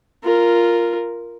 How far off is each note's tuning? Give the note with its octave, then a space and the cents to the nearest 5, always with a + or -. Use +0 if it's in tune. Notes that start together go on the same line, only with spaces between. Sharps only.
F4 -5 A#4 +0